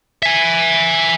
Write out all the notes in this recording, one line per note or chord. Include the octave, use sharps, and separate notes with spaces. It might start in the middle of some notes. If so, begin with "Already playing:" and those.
E5 G#5